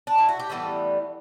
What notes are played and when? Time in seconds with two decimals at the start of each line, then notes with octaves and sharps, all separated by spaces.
0.07 D4
0.18 E4
0.29 F#4
0.39 G4
0.50 A2 E3 G3 B3 A4